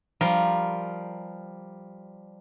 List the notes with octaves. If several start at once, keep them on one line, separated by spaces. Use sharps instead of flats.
F3 G3 A#4